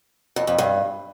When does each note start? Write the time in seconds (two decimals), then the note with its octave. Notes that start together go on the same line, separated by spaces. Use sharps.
0.36 F2
0.47 F2
0.58 G2